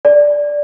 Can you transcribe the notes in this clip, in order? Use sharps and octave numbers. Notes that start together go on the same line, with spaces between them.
D5